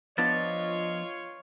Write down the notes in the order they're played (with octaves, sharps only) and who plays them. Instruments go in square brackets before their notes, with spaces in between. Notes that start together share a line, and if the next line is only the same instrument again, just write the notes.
[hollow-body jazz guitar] F3 B3 D4 [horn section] F4 C#5 [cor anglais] D#5 [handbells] A6